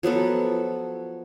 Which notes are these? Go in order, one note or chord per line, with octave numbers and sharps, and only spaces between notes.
F3 F#3 B3 A4